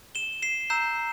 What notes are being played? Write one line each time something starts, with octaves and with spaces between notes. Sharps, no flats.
E7 G7
C7 E7
A#5 E6 G6 C7 E7